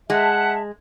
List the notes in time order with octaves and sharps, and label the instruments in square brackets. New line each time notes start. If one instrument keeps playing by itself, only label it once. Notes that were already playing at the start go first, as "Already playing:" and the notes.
[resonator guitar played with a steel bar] G#3 [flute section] E5 A5 [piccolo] F#5